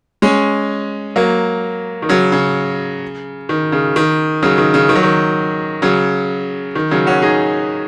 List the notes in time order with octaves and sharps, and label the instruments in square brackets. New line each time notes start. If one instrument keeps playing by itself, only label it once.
[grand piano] G#3 C#4
F#3 A#3
D#3
C#3 F#3
C#3
D#3
C#3
D#3
C#3 F#3
D#3
C#3
D#3
F#3
D#3
C#3 F#3
D#3
C#3 F#3
C#4 F#4
D#4 G#4